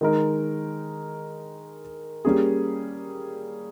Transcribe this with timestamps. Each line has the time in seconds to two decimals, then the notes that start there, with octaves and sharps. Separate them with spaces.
0.01 D#3 G#3 D#4 A#4
2.25 G3 A#3 C#4 G#4